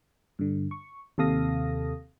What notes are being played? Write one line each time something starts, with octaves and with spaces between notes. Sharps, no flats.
G2 D3
C#6
D#2 C3 A4 F5 D#6 A#6